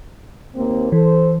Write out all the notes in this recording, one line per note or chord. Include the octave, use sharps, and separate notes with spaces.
D#2 A#3 C4
E3 A4 C5